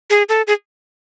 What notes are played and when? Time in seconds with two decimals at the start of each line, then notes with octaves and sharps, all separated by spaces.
0.10 G#4
0.29 A4
0.47 G#4